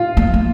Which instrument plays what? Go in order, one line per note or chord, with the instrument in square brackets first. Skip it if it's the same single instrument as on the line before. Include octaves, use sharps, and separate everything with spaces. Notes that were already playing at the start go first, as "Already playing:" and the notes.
Already playing: [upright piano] F4
[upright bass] A#3
A#3